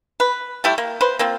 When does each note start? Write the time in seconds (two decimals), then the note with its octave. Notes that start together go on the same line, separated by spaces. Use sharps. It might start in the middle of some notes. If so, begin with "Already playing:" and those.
0.20 B4
0.64 G3 A3 E4 G4
0.78 A#3
1.01 B4 C5
1.19 A#3 C4 F4